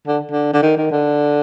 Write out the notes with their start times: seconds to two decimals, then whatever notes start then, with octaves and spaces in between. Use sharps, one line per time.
0.06 D3
0.31 D3
0.53 D3
0.62 D#3
0.77 D#3
0.91 D3